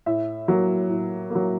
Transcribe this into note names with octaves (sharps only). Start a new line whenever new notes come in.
A2 E5
F#3 A#3
A2
F#3 A#3